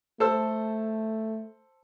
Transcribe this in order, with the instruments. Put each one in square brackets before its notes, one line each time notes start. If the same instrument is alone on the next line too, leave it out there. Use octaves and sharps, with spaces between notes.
[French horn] A3 [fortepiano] A4 C5 E6